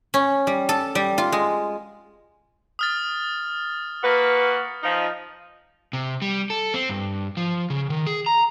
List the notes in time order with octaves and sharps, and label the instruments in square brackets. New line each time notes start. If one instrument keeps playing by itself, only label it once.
[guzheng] C#4
G3
A4
G3
F4
G#3
[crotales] D#6 F6 A6
[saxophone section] A#3 F#4 B4
F3 D#4
[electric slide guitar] C3
G3
A4
C4
G2
F3
C#3
D#3
G#4
A#5